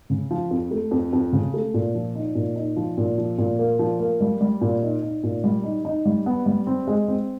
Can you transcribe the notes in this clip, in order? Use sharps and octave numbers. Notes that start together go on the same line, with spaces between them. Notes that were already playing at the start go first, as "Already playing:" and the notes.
C#3
F3
F2
A3
F2
F2
C#3
A3
A#2
F3
D#4
A#2
D#4
F3
A#2
F3
A#2
A#3
F3
A#3
G3
G3
A#2
D#4
D#4
A#2
G3
D#4
D#4
G3
B3
G3
C4
G#3
C4